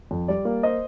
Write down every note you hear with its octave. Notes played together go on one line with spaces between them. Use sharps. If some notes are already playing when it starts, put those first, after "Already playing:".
F2
G3 D5
A#3
C5 D#5